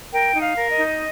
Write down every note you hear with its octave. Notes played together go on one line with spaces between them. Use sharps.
A#4 G5
D#4
F5
A#4
D#5
D#4